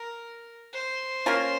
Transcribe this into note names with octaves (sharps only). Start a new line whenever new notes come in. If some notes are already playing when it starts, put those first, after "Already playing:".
Already playing: A#4
C5
A#3 C#4 F4 A#4